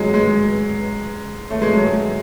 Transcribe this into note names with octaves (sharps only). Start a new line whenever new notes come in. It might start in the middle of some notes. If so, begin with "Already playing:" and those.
Already playing: F#3 G#3
G#3
A3
G#3
F#3
G#3